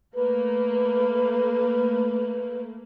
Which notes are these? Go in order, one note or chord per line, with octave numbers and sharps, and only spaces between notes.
A3 A#3 B4